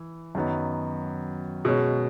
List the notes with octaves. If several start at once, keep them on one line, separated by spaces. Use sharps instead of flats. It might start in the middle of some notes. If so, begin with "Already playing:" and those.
Already playing: E3
F#2 D#3 F#3 B3 D#4
B2 G#3 C#4